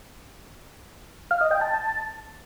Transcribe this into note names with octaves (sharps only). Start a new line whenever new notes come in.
F5
D#5
G5
A5